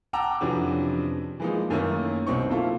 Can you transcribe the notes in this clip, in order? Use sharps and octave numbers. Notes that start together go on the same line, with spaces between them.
F#5 G5 A5 A#5 D6 E6
F2 C3 E3 F#3 C#4 D4
E3 F3 G#3 A#3 D#4
F#2 D#3 A3 A#3 C#4 E4
C2 B2 C4 D#4 C#6
A#3 E4 F4 A4